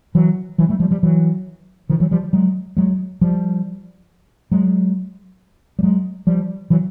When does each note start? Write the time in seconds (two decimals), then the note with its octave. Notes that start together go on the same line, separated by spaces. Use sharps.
0.15 E3 F#3
0.58 E3 F#3
0.69 G3 A3
0.80 F3 G3
0.91 F3 G3
1.03 E3 F#3
1.89 D#3 F3
2.00 E3 F#3
2.11 F3 G3
2.33 F#3 G#3
2.77 F#3 G#3
3.21 F3 G3
4.51 F#3 G#3
5.79 G3
5.83 F#3 G#3
6.27 F3 G3
6.70 E3 F#3